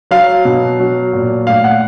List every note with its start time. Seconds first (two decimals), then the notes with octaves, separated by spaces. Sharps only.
0.11 F#3 F5
0.45 B2
0.80 F#3
1.13 A#2
1.47 A2 F5
1.64 F#5